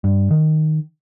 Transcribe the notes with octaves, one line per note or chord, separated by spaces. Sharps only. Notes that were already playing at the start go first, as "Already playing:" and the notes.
G2
D#3